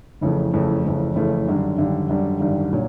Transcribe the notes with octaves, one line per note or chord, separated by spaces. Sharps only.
F#1 F2 C#3 E3 A3
F#1 F2 C#3 E3 A3
F#1 F2 C#3 E3 A3
F#1 F2 C#3 E3 A3
G#1 F#2 D3 G3
G#1 F#2 D3 G3
G#1 F#2 D3 G3
G#1 F#2 D3 G3
A#2 F#3